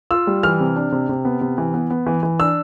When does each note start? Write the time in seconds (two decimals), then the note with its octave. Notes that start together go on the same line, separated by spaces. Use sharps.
0.11 F4 E6
0.27 G3
0.43 E3 F6
0.60 C3
0.76 D4
0.92 C3
1.09 C3
1.25 B3
1.41 C3
1.58 E3
1.74 B3
1.90 B3
2.07 E3
2.23 E3
2.40 D4 E6